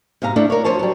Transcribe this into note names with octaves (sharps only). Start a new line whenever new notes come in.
G#2 C3 F5 A#5
A3 D4 E4 A4
A#4 C#5
F3 C5 C#5 A5
F#3 G3